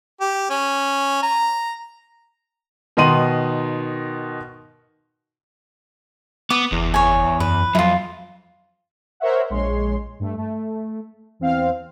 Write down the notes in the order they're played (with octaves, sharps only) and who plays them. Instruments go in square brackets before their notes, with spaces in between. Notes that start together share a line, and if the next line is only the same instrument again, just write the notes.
[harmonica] G4
C#4
A#5
[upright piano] B2 D#3 D#4 C6 D#7 F#7
[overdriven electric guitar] B3 [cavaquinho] D6
[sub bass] F#1 [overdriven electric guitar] E2
[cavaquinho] C#5 G#5
[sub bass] F#2 [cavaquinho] B4
[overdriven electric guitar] F2 [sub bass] F#3 [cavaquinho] E4 F4
[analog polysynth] A#4 C5 C#5 E5 F#5
A#1 G#3 C#5 C6
G2 A3
A3
E2 C4 F5